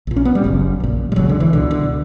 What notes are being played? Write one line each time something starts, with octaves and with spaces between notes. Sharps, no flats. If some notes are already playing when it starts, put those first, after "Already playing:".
A#1 A#2
C#4
B3
G3
F#1 F#2 C#3
A#1 A#2
G3
E1 D2 C#3 F#3
D3
E3
C#2 B2 D3
D3